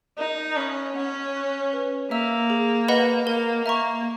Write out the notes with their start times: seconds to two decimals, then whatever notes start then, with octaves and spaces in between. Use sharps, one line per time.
0.19 D#4 A#4
0.57 C#4 E5 B5 D#6 F#6
0.95 C#4 F#5
1.34 C#6 F#6
1.73 B4
2.10 A#3 E5 A#5 E6
2.50 G#4
2.88 B4 D#5 F#5 B5
3.26 A#3 A#4
3.64 A#3 E5 A#5 C#6